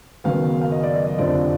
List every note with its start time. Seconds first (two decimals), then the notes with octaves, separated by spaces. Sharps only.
0.24 F#1 F#2 D#3 F#3 B3 F5
0.61 F5
0.72 D#5
0.83 D5
0.95 D#5
1.07 D#5
1.18 F1 F2 D3 F3 D5